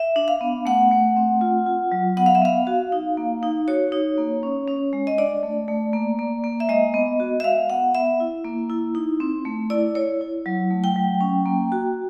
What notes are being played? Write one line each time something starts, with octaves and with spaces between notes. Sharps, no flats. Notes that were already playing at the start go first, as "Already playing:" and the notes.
Already playing: E5
D4
F5
B3
A3 F#5
A3
C4
F4
F4
F#3
B3 F#5
F5
E5
B3 F5
F#4
D#4
A#3
D#4
F#4 C#5
D#4
A#3
C#4
C#4
G#3
D#5
D4 D5
A3
A3
A#3
A#3
A#3
E5
G#3 D#5
B3
F#4
E5
G#3 F5
B3 F#5
B3 E5
E4
A#3
E4
D#4
C4
A3
E4 D5
E4 C#5
E4
F#3
A3
G5
F#3
C#4
A#3
F#4